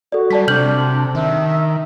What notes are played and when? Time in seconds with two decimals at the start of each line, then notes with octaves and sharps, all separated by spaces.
0.12 F#4 A4 D5
0.30 G3 D5 A5 B6
0.48 C3 D4 F6 G6 F#7
1.15 D#3 E5